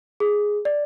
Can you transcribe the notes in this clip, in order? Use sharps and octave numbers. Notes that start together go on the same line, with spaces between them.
G#4
D5